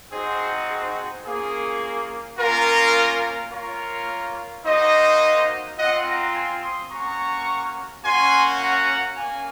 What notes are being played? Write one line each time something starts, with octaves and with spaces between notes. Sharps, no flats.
C4 D#4 F#4 G#4 C5
G#4 C5
A#3 C#4 F4 G#4
A#3 C#4 F4 A#4
A#3 F4 A#4 C#5
A#3 D#4 F#4 C5 D#5
C4 F4 D#5 F#5
F#5 A#5
G#5 C6
C6 D#6
A#3 C#4 F#4 A#5 C#6
A#3 C#4 F#4 G#5 C6
F#5 A#5
A#3 C#4 F5 G#5